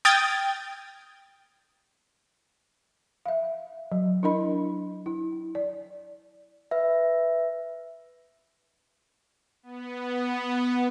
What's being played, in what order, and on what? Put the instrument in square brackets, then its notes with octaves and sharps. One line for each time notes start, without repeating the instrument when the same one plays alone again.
[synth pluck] G5 D#6 F6 G#6 A6
[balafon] E5 F5
F#3
D4 E4 A#4 D#5 B5
E4
D5
[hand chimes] B4 E5
[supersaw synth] B3